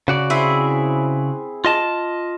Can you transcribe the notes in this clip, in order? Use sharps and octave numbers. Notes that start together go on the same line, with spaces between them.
C#3 F#4 D5
C4 E4 G#4
F4 D#5 A5